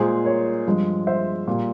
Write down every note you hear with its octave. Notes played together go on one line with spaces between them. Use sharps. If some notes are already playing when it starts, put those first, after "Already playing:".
Already playing: A#2 G#3 G#4 C5
A#4 C#5
G2 F3 G#3
C5 E5
A#2 G3 A#3